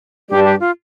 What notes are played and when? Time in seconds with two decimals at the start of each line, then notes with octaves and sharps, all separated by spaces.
0.29 G2 G3 D4 G4
0.45 G4
0.60 F4